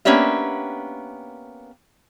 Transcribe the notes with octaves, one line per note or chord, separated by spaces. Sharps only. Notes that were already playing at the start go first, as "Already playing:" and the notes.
A#3 B3 C#4 D4 G4 E5